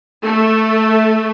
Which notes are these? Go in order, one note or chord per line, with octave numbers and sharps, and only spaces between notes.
A3